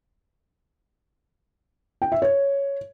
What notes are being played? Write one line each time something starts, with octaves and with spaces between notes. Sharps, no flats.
G5
E5
C#5